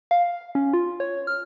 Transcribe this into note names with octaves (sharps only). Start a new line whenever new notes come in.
F5
C#4
F4
C#5
F6